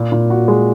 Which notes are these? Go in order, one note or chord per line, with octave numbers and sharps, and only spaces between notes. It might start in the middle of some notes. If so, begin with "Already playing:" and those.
Already playing: A#2
A#2
F#4
G#3